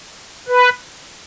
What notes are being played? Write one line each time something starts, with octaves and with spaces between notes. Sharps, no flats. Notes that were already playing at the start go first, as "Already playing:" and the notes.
B4